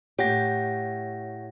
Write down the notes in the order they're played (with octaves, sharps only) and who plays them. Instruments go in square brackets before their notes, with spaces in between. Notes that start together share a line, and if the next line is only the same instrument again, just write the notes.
[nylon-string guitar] A2 G4 [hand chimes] C#5 F#5 A#6